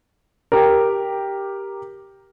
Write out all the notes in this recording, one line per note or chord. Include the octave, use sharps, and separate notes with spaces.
G4 A#4